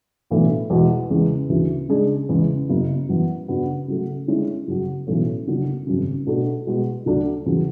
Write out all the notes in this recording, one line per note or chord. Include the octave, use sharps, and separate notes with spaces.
B1 A2 E3 A3 D4
E2 B2 G#3
E2 C#3 G#3
D2 C#3 E3
C#3 G#3 D4 G#4
E2 C#3 G#3
F#1 F#2 C#3
F#2 E3 B3
F#2 C#3 F#3 B3 D4
C#3 F#3 A3
D3 G#3 C#4 E4
F#2 C#3 F#3
B1 A2 E3 A3 C#4
F#1 F#2 D3 F#3
G#1 F#2 C#3
B2 A3 D4 F#4 A4
B2 G#3 B3 F#4
D2 D3 F#3 A3 D4
E2 C#3 F#3